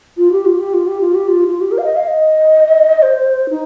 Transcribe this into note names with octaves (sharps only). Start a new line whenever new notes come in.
F4
G4
F4
G4
F4
G4
F4
G4
F4
F4
G4
A#4
F5
D#5
F5
D#5
C5
D#4